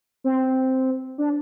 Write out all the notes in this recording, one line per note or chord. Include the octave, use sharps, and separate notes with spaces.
C4
D4